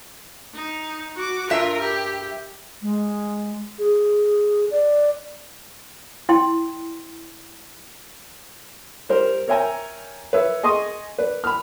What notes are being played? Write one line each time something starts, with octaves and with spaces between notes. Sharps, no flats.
D#4
F#4 D6
G2 F4 A#4 E5
G4
G#3
G#4
D5
E4 G5 C6
G3 G4 A#4 C5
A#4 C#5 E5 G5 G#5 A#5
B4 C#5 E5
G#4 D#5 C6 C#6 D#6
B4 D5
B5 F6